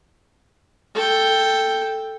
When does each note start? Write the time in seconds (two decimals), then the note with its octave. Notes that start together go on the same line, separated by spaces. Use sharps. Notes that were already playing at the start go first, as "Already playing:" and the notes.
0.95 A4 G5